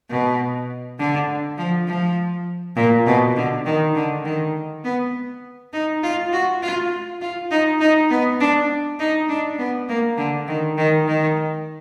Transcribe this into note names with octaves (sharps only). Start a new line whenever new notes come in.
B2
D3
F3
F3
A#2
B2
D3
D#3
D3
D#3
B3
D#4
F4
F#4
F4
F4
D#4
D#4
B3
D4
D#4
D4
B3
A#3
D3
D#3
D#3
D#3